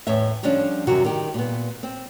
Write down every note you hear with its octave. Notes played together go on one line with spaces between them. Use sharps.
E2 A2 C#5 E5
D3 F3 G3 C#4 D4
F#2 C3 D#3 F#4
D#3 G3 G4
A#2 B3
C4